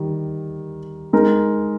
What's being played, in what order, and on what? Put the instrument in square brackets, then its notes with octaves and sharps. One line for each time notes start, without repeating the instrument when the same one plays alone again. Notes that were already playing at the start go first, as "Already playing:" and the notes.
Already playing: [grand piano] D#3 G3
G#3 D#4 A#4